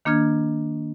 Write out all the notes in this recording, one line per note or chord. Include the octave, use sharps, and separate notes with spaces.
D#3 A#3 D4 F6 G#6